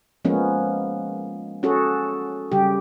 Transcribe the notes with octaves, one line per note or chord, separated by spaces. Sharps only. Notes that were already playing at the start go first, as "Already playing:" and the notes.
F3 G#3 A#3 B3 C#4
C#4 F#4 G#4 A4
C#3 G3 G4